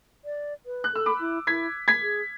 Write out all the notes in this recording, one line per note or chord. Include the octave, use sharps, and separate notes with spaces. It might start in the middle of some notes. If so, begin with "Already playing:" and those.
D5
B4
F#6
A4 E6
B5 D6
E4
E4 G#6 B6
G#6 B6
G#4